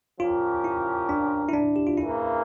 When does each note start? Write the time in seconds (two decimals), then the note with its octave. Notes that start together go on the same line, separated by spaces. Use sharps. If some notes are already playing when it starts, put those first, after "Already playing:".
0.20 F3 C#4 F4 G4 A#4
0.64 E4
1.09 D4
1.49 E4
1.53 D4
1.76 G4
1.87 F4
1.97 C#3 E3 A#3 E4